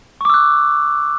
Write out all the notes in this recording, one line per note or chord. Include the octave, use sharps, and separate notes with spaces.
C#6 D6 E6 F#6